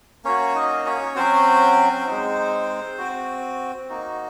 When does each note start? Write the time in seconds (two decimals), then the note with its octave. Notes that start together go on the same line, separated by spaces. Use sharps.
0.24 A#3 C#4 F#4 C#5
0.55 D#4 D#5
0.85 C#4 C#5
1.16 F#3 C4 C#4 F#4 C5
2.07 G#3 C4 D#4
2.98 C4 F#4
3.89 A#3 D#4 F#4